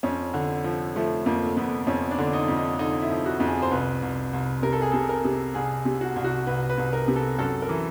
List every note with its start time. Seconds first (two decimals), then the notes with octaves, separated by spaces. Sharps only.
0.03 F2 C#4
0.34 D3
0.64 F3
0.96 F3 A3
1.26 F2 A#3
1.56 F2 B3
1.87 F2 C#4
2.11 D4
2.18 D3
2.33 D#4
2.48 F2
2.57 D#4
2.79 D3 D#4
3.02 E4
3.10 F3
3.26 F#4
3.40 F2
3.48 G#4
3.62 C5
3.71 C2 B4
4.02 C2
4.33 C2
4.62 C3 A#4
4.73 A4
4.82 G#4
4.92 C3 A4
5.09 A#4
5.24 C3
5.54 C2 G#4
5.85 C3
6.01 F#4
6.16 C2
6.24 F#4
6.47 C2 B4
6.69 B4
6.78 C2
6.93 A#4
7.08 C3
7.16 A4
7.38 F#2 A4
7.62 A#4
7.69 E3